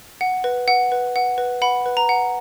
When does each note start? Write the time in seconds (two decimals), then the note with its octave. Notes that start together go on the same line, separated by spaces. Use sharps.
0.21 F#5
0.44 B4
0.68 F#5
0.92 B4
1.16 F#5
1.38 B4
1.62 F#5 B5
1.86 B4
1.97 A#5
2.09 F#5